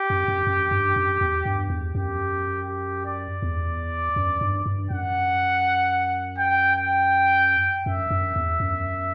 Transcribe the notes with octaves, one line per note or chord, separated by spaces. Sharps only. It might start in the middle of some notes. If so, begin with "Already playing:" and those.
Already playing: G4
F#2
F#2
F#2
G2
F#2
E2
G2
E2
F#2 G4
G4
D5
E2
F#2
G2
G2
F#2 F#5
G5
G5
F#2 E5
F#2
E2
F#2